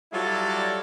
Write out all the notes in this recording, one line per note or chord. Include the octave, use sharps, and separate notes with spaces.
F#3 G3 E4 F4 A4 D5